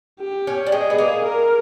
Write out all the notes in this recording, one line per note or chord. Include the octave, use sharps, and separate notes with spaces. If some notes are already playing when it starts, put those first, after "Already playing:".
G4
C#4
G3
G#3 G#4
B3
A#3
A#4